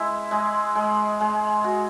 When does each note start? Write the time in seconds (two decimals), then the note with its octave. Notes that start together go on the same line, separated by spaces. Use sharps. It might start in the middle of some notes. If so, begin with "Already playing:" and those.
Already playing: G#3 E4
0.31 G#3
0.75 G#3
1.20 G#3
1.64 F#4